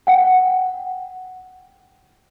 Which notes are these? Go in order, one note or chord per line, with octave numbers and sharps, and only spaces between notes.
F#5 G5